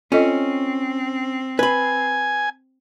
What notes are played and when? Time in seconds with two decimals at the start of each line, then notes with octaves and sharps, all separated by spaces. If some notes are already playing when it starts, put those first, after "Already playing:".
0.12 C4 C#4 F4 A4 D#5
1.59 B4 G#5 B5